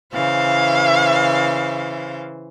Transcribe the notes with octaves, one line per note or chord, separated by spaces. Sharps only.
C#3 E3 C5 F5